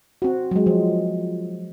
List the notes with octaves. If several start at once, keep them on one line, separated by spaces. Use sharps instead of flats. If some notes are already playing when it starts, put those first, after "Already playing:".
C4 F#4
F#3 G#3
F3